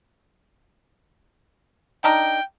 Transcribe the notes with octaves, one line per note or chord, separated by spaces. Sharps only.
D4 D#4 A#4 G5